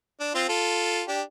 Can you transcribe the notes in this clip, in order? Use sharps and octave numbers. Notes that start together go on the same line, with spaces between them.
D4
C4 F4
F4 A4
D4 G4